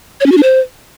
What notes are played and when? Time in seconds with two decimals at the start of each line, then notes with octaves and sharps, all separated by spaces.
0.21 C#5
0.26 C#4
0.32 F#4
0.37 D4
0.43 C5